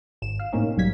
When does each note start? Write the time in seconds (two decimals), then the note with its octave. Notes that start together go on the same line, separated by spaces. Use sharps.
0.22 G#1 E7
0.39 F5
0.52 A2 C3 A#3 C4 C#4 D#4
0.77 B1 G#2 F#3 G3 G#6 B6